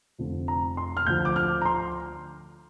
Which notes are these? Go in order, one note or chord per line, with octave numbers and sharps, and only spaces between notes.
F1 F2 D3 F3
A#5
C6
F6
D2 D3 F3 G6
D6
F6
A#5
C6